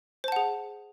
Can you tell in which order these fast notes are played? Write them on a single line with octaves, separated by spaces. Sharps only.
C5 A5 F#5 G#4